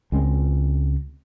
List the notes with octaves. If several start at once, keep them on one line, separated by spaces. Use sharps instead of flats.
C#2 G#3 C4